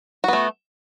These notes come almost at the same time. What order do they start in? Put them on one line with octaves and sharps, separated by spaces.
F#4 B3 A3